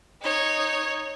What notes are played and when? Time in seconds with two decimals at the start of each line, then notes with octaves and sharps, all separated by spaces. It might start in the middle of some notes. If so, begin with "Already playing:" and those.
0.22 D#4 C#5